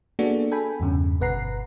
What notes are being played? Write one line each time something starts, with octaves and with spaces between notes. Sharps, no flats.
A#3 B3 D4 F#4 G#4 A4
A4 G5 G#5 B5
E2 G2 C#3
G1 B2 B4 F#5 A#5 C7